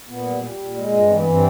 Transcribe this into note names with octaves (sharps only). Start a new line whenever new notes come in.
A#2 B3
G3
G3
A#2
G#3
G2
E3 C4
B3
G2
C4